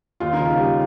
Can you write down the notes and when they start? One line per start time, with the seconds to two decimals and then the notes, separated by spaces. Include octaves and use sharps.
0.20 D#2 F4
0.33 D#4
0.40 C#3
0.45 F4
0.59 G3